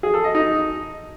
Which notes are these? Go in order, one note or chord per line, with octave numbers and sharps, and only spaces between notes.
G#4
A4
D#5
D#4